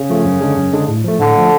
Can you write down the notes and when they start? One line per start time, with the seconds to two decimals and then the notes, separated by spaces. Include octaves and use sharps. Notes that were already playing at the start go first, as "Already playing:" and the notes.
Already playing: C#3
0.10 F3 A3 F4
0.25 F#2
0.41 D3 G#3 D4 G#4
0.57 F#2
0.72 D3 G#3 D4 G#4
0.88 A2
1.04 F3 A3
1.19 A2 D3
1.35 F3 A3